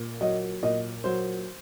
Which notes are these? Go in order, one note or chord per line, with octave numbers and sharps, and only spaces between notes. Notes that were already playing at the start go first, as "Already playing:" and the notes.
Already playing: A#2
F#3 D#5
A#2 D#5
F#3 C5